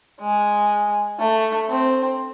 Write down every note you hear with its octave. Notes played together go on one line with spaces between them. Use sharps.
G#3
A3
C4